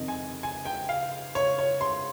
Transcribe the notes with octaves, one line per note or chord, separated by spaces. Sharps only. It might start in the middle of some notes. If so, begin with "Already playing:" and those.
Already playing: F2 C3 D#3 D#5
G#5
G#5
G5
F5
C#5
C#5
C6